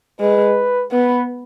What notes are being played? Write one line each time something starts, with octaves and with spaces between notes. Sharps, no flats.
G#3 B4
B3 B4